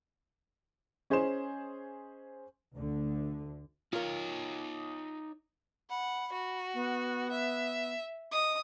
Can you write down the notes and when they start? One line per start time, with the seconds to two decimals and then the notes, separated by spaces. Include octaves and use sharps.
1.10 C#4 G#4 C5 D#5 C6 E7
2.75 D2 D3
3.93 D#4 F4 A#4 C#5
5.90 F#5 B5
6.32 F#4
6.73 B3
7.31 E5
8.32 D#5 D#6